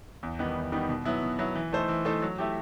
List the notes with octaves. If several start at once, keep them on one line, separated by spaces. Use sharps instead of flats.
E2
D#3 G3 B3 D#4
E2
D#3 G3 B3 D#4
B2
F#3 B3 E4
B2
F#3 B3 E4
E3
A3 D#4 A4 C5
E3
A3 D#4 A4 C5
F#3
A3 E4 G4